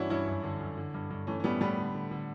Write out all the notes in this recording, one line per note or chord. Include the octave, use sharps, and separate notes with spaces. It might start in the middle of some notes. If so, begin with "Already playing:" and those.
Already playing: G2 E3 C#4 D4 E4 F#4
G2 C#4 E4
F#2
D3
F#2
D3
G2
G2
E3 A3 C#4
C#4
A2 G3 B3
A2 G3 B3
D3
D3
D3